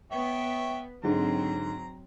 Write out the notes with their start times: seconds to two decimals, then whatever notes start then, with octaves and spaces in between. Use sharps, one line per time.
0.12 B3 C#5 E5 G5
1.03 G#2 D3 F#3 C4 A#5